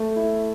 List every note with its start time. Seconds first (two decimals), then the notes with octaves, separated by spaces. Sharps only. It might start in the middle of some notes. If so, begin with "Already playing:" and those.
Already playing: A3
0.16 E4